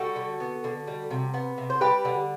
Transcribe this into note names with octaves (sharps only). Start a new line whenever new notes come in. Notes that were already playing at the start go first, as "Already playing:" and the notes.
Already playing: G3 F#4 A4
D3
B3
D3
G3
C3
B3
C3
C5
G3 G4 B4
D3